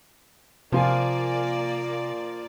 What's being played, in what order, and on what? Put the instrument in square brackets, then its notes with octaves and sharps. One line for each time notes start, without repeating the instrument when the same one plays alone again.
[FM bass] C3 [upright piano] F3 F4 G#5 [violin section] A#3 D5